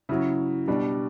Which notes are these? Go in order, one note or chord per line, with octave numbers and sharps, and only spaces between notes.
C#3 F#3 E4
B2 G3 D4